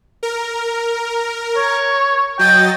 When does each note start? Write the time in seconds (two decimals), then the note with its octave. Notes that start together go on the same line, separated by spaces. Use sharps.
0.23 A#4
1.56 C#5
2.39 F#3 D#5 G5 A6